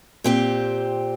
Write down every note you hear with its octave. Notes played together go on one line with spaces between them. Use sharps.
A#2 C4 G4